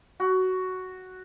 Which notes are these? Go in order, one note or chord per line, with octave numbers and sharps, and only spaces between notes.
F#4